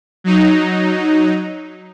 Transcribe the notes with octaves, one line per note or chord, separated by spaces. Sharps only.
F#3 D#4